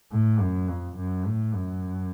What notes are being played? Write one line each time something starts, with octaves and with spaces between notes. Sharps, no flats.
A2
F#2
F2
F#2
A2
F#2